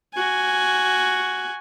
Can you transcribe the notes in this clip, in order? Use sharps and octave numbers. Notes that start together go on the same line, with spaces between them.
F#4 G#5